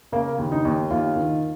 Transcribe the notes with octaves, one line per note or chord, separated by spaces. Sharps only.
C#3 A#3
D#2
D#4
D#2
D#2 F4
D#3